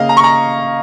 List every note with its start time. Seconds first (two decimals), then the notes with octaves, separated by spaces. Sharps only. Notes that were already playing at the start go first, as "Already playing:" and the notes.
Already playing: C#3 A#3 D#5 F5
0.09 A#5
0.17 C#6
0.24 A#5